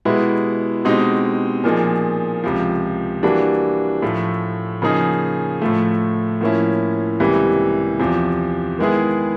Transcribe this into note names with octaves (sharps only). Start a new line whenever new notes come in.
B2 G#3 B3 E4 G4
B2 G#3 C4 D#4 G4
A#2 F3 A#3 D#4 G#4
C#2 C3 F3
E3 G3 A#3 D4 F#4
A2 F3 A3
C#3 F3 A#3 D#4 G#4
A2 F3 A3
A2 F3 A#3 C#4 E4
C#2 C3 E3 G3 A#3
E2 C3 F3
D#3 G#3 B3 E4 G#4